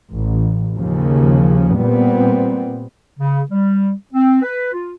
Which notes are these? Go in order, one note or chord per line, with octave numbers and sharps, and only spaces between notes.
A1
D#2 C#3 F3
A#2 G3 B3 C4
C#3
G3
C4
B4
F4